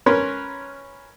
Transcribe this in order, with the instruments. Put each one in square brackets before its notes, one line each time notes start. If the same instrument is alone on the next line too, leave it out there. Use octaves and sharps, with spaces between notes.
[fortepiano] C#4 A#4 B4 C#5 C6